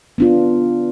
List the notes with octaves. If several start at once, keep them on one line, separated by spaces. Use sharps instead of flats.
B3 D4 F4